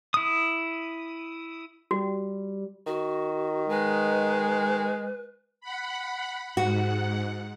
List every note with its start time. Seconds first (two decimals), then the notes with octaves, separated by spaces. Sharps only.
0.14 E4 D#6
1.91 G3 F#4
2.87 D#3 F#4
3.69 G#3 B4
5.61 F#5 B5
6.57 G#2 F#4 F#5